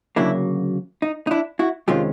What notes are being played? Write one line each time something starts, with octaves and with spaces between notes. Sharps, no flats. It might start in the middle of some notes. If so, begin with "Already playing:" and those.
D2 C#3 F#3 A#3 D4 E4
D#4
D#4
D4 E4
E4 F#4
F2 C3 D#3 G#3 C#4 F4 G4